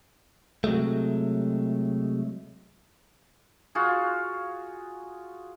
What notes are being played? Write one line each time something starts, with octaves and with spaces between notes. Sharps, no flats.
C3 F#3 G#3 A3
F4 F#4 G#4